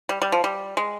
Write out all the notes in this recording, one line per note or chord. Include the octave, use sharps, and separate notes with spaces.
G3
G3
F3
G3
G#3